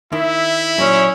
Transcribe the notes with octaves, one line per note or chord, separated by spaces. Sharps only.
D#3 E4 E5
A#2 F#3 C#4